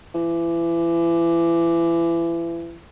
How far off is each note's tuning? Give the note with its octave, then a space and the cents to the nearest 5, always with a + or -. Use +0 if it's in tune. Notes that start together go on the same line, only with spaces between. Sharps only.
E3 +30